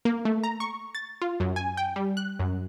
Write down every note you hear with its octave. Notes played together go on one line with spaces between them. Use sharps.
A#3
A3
A#5
C#6
A6
F4
F#2
G#5
G5
G3
F#6
F#2